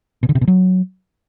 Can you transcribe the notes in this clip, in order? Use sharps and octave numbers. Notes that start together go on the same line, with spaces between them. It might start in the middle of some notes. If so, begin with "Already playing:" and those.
B2
D3
C3
B2
F#3